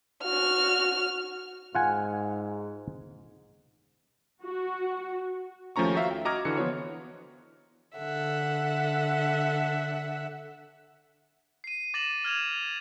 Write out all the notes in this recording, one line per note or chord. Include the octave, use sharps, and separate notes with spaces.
F#4 F6
G#2 F4 F#5 G#5
F#4
D#2 F3 A3 C#4 A#5 C#6
F#4 E5 F5
G5
F#4 D#5 A#5 D6 F6 G#6
D3 E3 F#4 C#7
F3 B3 F4 C#5
D3 A4 E5 F#5
C7 D#7
D6 A6 A#6 D#7 E7 F#7
F6 G#6 E7 F7